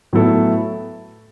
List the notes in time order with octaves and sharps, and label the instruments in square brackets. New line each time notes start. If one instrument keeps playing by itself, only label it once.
[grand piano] A2 F#3 B3 E4 A4